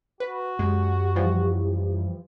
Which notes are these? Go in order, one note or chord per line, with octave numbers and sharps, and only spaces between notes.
F#4 B4
F#2 G#3 G4
E3 F3 G3